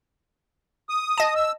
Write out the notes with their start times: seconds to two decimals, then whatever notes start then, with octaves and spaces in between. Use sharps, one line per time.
0.89 D#6
1.18 D#5 A5
1.35 E6